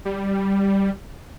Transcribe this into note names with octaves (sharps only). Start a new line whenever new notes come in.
G3